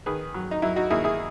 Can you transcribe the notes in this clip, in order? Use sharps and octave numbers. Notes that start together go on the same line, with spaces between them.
D#3 G#4 B4
F#3
D#4
F#3 E4
D#4 F#4
D#2 E4 G#4
E4 G#4